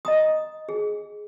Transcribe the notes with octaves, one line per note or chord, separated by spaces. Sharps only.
D#5 A#5 D#6
G#4